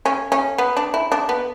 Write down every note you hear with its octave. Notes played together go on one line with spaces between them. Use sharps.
C#4
C#4
B3
D4
E4
D4
B3